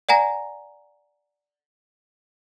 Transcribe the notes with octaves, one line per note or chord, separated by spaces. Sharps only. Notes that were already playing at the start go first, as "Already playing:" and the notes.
D5 F#5 G#5 A#5 A#6